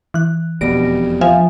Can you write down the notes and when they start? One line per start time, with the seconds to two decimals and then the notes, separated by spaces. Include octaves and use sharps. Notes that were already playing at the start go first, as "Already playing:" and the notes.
0.14 E3 F#6
0.61 E1 F2 B2 G3 B3 A#6 D7
1.21 F3 E5 F5 G#5